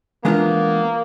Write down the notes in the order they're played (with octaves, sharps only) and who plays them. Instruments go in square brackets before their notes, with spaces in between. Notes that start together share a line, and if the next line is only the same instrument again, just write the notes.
[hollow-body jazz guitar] E3 G#3 B3 D4 F4 [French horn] A#3